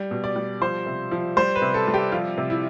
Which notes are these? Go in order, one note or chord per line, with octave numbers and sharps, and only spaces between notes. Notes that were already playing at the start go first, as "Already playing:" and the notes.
Already playing: G3
B2
D5
G3
F3 C5
C3
F3
G3 C5
B4
C3
A4
G3
G4
F3 F4
C3
E4